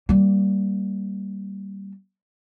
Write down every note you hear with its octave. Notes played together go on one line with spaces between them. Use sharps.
G3 A#3